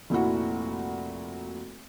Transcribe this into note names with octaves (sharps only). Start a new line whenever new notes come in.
F1 A#2 E4 F#4